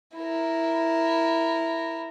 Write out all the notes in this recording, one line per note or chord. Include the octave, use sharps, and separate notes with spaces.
E4 A#4